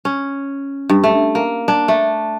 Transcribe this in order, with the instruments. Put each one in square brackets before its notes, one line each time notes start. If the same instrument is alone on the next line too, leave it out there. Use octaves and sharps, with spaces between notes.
[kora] C#4
G2
A3
A#3
D4
A3